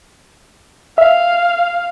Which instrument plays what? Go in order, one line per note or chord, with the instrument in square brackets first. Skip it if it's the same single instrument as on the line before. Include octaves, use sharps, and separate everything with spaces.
[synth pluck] E5 [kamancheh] F5